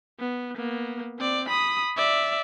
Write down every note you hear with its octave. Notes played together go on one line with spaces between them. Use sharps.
B3
A#3 B3
C4 D5
B5 D#6
D5 E5